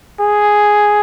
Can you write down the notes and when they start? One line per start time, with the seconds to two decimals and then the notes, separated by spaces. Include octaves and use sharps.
0.21 G#4